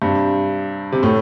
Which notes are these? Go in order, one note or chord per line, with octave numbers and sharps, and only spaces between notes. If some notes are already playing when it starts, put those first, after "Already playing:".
G2 C3
C3
A2